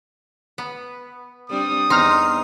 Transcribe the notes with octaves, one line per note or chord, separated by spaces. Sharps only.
B3
G3 C4 D4 D#6
E2 C4 D#4 C6 F6